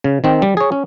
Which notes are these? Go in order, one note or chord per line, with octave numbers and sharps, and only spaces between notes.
C#3
D#3 C4
G3
G#4 C#5
C#4